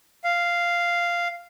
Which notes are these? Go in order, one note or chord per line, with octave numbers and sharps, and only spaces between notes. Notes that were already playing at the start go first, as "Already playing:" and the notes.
F5